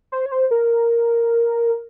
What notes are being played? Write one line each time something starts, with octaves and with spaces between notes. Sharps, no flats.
C5
C#5
C5
A#4